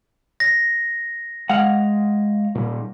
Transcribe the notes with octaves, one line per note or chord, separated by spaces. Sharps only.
A#6
G#3 F5 F#5
A#2 G3